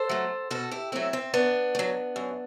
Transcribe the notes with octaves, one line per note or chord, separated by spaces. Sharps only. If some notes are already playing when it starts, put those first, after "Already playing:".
Already playing: A4 C5
F#3 A3
B2 F#4 A4
E4 G4
F#3 A3 C4 E4
C4
F#2 B3 D4
A3
F#3
F#2